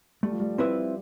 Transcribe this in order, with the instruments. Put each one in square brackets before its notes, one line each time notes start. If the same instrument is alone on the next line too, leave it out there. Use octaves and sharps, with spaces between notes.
[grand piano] G3 [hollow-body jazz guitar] A3
[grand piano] F3
G3
[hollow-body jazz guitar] C4 E4 B4 E5